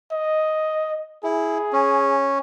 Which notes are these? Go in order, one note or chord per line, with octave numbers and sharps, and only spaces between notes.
D#5
E4 G#4
C#4